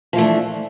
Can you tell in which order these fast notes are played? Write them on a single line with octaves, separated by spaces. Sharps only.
F3 E3 A3 D4